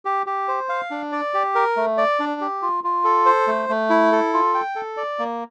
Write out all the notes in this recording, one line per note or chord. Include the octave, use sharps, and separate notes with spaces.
G4
G4
C5
F5
D4
D5
G4
A#4
A3
D5
D4
G4
F4
F4
A4
C5
A3
A3
E4
A4
F4
G5
A4
D5
A#3